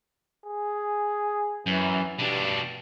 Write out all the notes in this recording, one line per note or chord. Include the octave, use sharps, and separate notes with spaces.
G#4
F#2 E3
G2 B2 D4